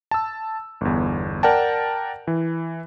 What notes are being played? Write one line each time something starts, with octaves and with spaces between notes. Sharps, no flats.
A5 E6
G1 E2
A#4 D5 F#5 G5 A5
E3